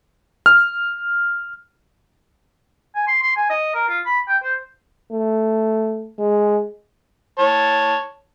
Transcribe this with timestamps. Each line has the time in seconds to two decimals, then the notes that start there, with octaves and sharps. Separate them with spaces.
0.46 F6
2.95 G#5
3.08 C6
3.23 C6
3.36 G#5
3.50 D#5
3.75 A#4
3.89 F4
4.06 B5
4.28 G5
4.43 C5
5.12 A3
6.19 G#3
7.39 C#5 A5